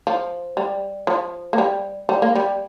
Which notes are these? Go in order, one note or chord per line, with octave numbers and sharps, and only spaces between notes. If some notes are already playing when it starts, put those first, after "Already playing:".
F3
G3
F3
A#3
G3
G3
A#3
G3